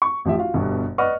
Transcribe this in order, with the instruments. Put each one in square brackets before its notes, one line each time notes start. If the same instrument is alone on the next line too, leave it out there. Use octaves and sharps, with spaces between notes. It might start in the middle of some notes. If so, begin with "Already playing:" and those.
[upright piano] C#6
A1 F3 G4 E5
F4 F#4 F5
G1 G2 B2
B4 D5 D#5 F#5 C#6 F6